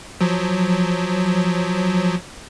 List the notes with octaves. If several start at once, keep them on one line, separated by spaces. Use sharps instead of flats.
F3 F#3